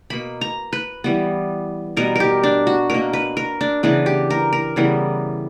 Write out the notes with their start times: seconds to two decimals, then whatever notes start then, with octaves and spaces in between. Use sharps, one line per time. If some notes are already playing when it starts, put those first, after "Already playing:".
0.10 B2 A#3 B5
0.41 A#5
0.73 B4
1.04 E3 G3 B3
1.97 B2 G3 B3 A#4
2.15 G4 A#4
2.43 D4
2.67 F#4
2.90 B2 A#3 A#4
3.13 B4
3.37 A#4
3.61 D4
3.83 C#3 E3 B3 D4
4.06 G4
4.30 A#4
4.53 A#4
4.76 C#3 E3 G3 B3